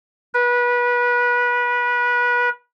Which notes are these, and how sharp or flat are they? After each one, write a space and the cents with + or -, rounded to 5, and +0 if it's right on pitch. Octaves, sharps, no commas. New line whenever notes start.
B4 -25